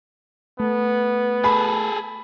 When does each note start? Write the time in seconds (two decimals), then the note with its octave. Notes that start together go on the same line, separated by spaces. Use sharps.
0.60 A3 B3
1.44 G#4 A4 B5